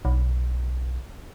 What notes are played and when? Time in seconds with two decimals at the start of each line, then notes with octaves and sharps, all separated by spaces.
0.05 B1